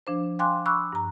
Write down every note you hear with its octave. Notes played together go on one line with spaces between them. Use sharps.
F3 D4 C5
F5 G5 G#5 C6 D6 F#6
B5 C#6 D6 E6 F#6
G2 A#5